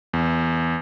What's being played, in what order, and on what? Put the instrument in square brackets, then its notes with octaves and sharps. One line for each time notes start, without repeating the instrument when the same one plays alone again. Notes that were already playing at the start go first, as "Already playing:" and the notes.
[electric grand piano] E2